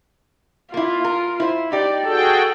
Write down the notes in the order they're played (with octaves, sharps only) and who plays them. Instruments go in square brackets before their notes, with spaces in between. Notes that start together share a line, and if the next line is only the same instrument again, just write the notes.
[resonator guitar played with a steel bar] A#3 E4 [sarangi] F4
[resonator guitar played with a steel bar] A#4
E4 C5
[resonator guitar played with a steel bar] D#4 G4 [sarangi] D5
[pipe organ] F#4 G#4 G5 [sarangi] A4